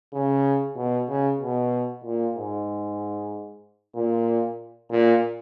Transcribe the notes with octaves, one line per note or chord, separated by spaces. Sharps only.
C#3
B2
C#3
B2
A#2
G#2
A#2
A#2